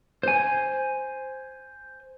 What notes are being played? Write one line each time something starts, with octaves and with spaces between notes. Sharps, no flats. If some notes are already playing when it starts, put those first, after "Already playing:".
C5 G#5